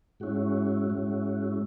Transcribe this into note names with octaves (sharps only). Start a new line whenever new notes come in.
G#2 G#3 C#4 E4 F#4
G#2 G#3 C#4 E4